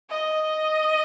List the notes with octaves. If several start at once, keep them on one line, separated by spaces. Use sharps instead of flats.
D#5